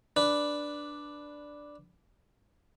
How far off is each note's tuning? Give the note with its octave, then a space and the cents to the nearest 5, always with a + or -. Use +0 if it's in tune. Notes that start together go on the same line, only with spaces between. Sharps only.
D4 +0 B4 +0